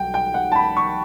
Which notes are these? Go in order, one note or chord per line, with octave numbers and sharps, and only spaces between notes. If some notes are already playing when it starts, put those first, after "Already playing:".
Already playing: B1 G3 F#5 G5
G5
F#5
A5
B5
C#6